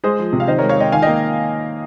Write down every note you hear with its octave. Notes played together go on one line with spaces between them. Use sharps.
G#3 G#4 C5
F3
C3
F5
D#3 C5 D#5
G#3 A#4 C#5
C#5 F5
G#3 D#5 G5
D#3 F5 G#5
A#3 D#5 G5